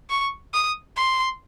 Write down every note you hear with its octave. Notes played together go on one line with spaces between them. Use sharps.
C#6
D#6
C6